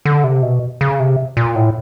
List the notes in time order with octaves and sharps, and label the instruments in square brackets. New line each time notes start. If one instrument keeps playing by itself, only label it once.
[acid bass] D3
C3
B2
C#3
C3
A#2
A2